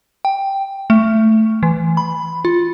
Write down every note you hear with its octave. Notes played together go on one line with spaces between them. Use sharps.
G5
A3
E3
B5
F4